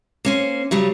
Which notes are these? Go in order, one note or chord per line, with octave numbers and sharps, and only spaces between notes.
A#3 C#4 C5
C#3 F#3 G3